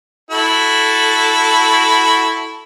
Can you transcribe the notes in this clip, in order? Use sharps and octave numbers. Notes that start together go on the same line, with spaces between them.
E4 F#4 A4